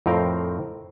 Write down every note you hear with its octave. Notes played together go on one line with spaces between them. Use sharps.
F2 A2 C4 A#4 F5 G5